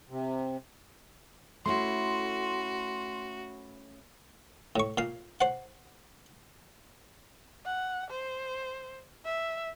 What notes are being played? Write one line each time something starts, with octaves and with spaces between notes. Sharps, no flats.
C3
A3 C#4 E4 F#4 C6
A2 C#6
A#2 F5
C5 F#5
F#5
C5
E5